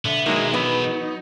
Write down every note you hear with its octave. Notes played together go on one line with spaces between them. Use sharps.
B1 D3 B3 E5
B2 D#3 E3 F#3 G#3 A#3
F#3 B3 D#4 B4